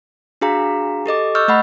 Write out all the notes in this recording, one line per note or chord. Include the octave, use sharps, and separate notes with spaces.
D4 F#4 G#4 F5 A#5
G4 A4 D#5 D6
D#5 C#6 E6 F6 G6
A3 D#5 F#5 B5